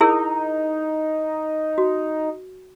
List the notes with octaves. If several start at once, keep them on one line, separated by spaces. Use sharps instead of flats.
D#4 E4 G#4 A#4
F#4